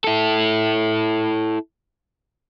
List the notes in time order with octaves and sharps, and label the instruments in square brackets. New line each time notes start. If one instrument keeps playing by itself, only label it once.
[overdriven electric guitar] E4 A4